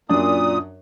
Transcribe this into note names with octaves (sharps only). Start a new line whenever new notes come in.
F#2 A#2 D4 D#6